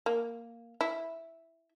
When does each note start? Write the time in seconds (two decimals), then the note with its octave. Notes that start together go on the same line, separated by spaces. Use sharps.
0.06 A#3
0.81 E4